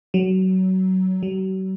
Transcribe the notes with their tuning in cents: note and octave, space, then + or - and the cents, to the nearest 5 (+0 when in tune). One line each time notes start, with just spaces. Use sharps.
F#3 +20
F#3 +40